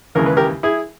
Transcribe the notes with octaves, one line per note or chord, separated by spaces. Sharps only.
D#2 C#3 E3 G#3 A#4
B4
G4 A#4
E4 G#4